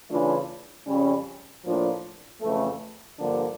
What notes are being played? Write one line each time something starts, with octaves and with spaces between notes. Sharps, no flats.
C#3 E3 A3 D4 F4
F2 C#3 G3 C#4
A2 F3 A#3 D4 F4
F2 C#3 E3 A3
G2 D3 F3 A#3 D4